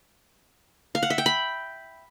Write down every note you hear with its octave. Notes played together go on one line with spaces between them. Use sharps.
F5
F#5
E5
G5
B5